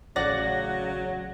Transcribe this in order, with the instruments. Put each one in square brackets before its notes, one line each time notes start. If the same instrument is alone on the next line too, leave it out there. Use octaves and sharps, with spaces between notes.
[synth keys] A1 F#5 A#6 [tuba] C#3 [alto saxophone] F#3 [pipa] D5